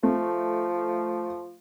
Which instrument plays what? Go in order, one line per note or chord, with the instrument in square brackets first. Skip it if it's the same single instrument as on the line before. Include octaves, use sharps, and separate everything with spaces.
[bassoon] F3 [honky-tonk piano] A3